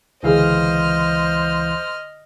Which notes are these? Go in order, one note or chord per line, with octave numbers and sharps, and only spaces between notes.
C#2 D3 E3 G#4 C5 D#5 F5 F6